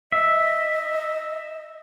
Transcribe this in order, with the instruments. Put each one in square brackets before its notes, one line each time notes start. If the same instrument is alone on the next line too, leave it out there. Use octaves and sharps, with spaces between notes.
[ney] D#5 [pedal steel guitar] E5